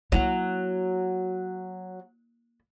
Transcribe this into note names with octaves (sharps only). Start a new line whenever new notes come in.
F#3 A#3 E4